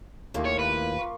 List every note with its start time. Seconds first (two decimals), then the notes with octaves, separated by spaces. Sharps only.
0.34 D#2 A2 A3 A#3 F4 G4
0.45 C#5
0.59 A#4 B4 F5 A5
0.98 A#3 F4 C#6